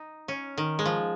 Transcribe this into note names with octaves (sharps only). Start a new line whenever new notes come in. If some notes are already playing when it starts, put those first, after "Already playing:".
Already playing: D#4
C#4
D#3
G#3
F3